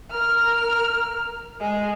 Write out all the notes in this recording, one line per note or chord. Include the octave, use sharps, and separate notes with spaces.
A#4 F6
G#3 G#4